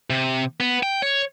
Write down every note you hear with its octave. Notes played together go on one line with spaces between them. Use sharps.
C3
B3
G5
C#5